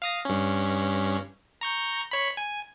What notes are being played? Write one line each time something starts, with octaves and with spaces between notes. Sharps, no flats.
F5 D#6 A#6
G2 C#4
A#5 C#6 G6
C#5 B5
G#5